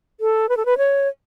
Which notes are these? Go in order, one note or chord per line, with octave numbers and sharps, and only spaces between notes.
A4
B4
A4
B4
C#5